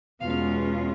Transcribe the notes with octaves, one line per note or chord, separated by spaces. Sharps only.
E2 B2 G#3 C#4 F4 F5